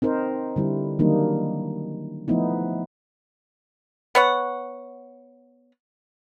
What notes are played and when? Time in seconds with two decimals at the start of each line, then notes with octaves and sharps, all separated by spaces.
0.02 C4 D#4 A#4 C5
0.56 D3 G3 E4
0.99 D#3 F#3 G3 A#3 D4 D#4
2.28 F3 A3 B3 D#4 E4
4.15 B3 C#5 F#5